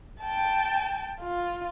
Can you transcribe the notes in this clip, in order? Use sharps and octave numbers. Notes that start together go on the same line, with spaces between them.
G5 A5
F4